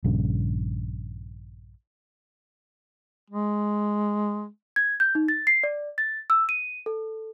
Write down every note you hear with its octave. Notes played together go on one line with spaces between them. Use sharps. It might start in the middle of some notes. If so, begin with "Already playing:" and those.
A#1 G2 C#3
G#3
G#6
G6
D#4
A6
C7
D5
A6
E6
D#7
A4